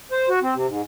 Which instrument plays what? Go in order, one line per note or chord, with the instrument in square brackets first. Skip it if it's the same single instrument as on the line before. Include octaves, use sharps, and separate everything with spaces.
[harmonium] C5
F#4
C4
C3
G#2